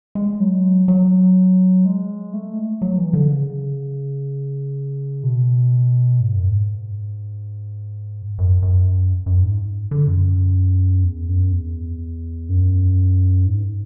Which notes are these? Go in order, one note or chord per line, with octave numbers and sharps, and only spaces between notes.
G#3
F#3
F#3
G#3
A3
F#3
E3
D3
C#3
B2
G#2
F#2
G#2
F#2
F#2
F#2
G#2
D3
F#2
E2
F#2
E2
F#2
G#2